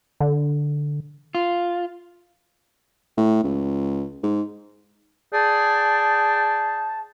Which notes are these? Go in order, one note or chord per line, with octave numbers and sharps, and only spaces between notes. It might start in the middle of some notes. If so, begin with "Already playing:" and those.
D3
F4
A2
C#2
G#2
G#4 D5 G5 A5